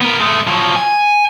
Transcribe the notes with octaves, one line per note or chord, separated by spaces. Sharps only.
B3 A#4
G#3 A3
F3 F#3
G#5